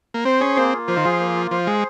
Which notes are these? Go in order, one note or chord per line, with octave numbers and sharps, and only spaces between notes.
A#3
C4 C5
C#4 G#4
A#3 C4
F4
F3 C5
D#3
F3 G#4
A#3
F4
F3 C5
G#3 G#4